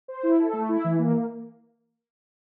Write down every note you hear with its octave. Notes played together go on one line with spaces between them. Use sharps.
C5
E4
A4
A3
E4
E3
A#3